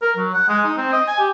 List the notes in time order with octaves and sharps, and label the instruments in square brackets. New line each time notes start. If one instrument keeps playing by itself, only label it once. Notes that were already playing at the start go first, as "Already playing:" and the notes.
[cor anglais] A#4
F#3
F#5
G#3
D#4
C4
D#5
G#5
G4